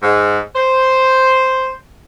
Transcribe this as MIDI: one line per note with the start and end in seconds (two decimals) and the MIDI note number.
0.03 0.40 44
0.55 1.70 72